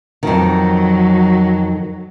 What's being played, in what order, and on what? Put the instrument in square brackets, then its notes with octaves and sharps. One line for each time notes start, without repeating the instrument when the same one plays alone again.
[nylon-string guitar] F2 D#3 [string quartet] F#3